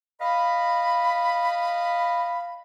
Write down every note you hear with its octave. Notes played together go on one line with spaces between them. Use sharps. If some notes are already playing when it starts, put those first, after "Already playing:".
D#5 F5 B5